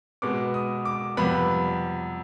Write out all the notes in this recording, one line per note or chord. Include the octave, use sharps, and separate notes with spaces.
B2 G#3 B3 D6
D#6
D6
F2 C3 G3 B3 B5